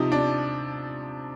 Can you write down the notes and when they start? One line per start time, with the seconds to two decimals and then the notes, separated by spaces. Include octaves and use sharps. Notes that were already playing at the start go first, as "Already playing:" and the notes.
Already playing: C3 F3 D#4
0.12 D4